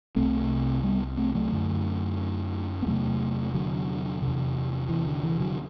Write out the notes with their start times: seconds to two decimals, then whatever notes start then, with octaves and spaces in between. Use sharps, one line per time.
0.16 C2 C3 A3 C4
0.83 G3 B3
1.17 A3 C4
1.35 F#3 A3
1.52 F#2 D3
2.82 B3
2.86 E2 C3 F#3 A3
3.54 D3 F#3
4.22 E2 C3
4.89 E3
5.07 D3
5.23 E3
5.40 D3 F#3